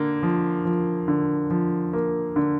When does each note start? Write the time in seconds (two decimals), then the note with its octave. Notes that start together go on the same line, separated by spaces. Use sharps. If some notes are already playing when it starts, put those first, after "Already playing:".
Already playing: D3 A#3
0.23 F3
0.65 F3
1.08 D3
1.50 F3
1.93 A#3
2.36 D3